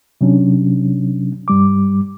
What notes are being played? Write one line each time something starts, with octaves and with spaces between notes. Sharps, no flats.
C3 F#3 C#4 D4
G2 G3 D6